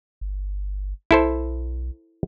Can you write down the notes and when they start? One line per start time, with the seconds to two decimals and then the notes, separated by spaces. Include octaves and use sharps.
0.21 G1
1.11 B1 E4 A4 C5